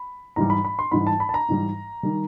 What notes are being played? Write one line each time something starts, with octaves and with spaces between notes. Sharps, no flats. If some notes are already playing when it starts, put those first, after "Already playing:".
Already playing: B5
G#2 E3 G3 A#5
B5
B5
C6
G#2 E3 G3 B5
A5
B5
A5
A#5
G#2 E3 G3
D#3 G3